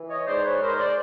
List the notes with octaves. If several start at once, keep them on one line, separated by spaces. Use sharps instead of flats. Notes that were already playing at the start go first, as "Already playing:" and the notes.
Already playing: E3
C#5 D#5
G#2 C5 D5
B4 C#5
G#3 A#4 C5
C5 D5